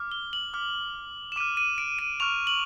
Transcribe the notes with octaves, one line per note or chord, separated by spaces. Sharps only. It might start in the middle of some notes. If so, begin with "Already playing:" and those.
Already playing: D6 F6
G7
F#7
D6 F6
E7
D6 F6 D#7
D#7
D7
D#7
C#6 F6 F7
F#7